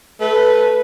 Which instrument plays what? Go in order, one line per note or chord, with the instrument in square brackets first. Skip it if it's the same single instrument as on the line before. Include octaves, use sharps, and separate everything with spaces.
[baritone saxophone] A3 [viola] B4